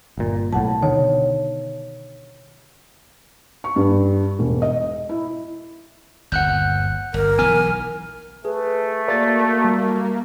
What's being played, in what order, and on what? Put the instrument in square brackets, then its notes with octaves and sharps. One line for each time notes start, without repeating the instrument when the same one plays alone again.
[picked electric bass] G1 A#2
[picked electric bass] B1 A2 [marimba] F#5 A5
[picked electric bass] B2 D3 D#3 [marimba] C#5
[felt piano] C#6
G2
E1
D#5
E4
[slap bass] G1 D#2 [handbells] F#5 F#6 G6
[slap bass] G1 [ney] A#4
[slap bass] B1 E3 B3 [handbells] G#5 F6
[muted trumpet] A3 [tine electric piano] G#4 [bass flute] B4
[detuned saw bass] A#3 [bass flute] F#4 [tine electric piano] D5 A6
[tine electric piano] G3